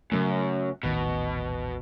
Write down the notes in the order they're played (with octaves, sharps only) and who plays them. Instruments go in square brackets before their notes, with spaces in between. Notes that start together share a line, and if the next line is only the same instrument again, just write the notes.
[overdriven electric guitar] F#2 [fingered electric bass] C#3 F#3 A3
[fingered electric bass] D#1 A1 D#3 [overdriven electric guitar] B2